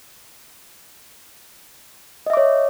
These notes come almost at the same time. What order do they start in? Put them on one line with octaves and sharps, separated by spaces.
D#5 E5 D6 C#5